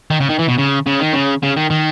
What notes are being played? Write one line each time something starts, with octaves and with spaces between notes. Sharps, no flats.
D#3
C#3
D#3
E3
B2
C#3
C#3
D#3
C#3
C#3
D#3
D#3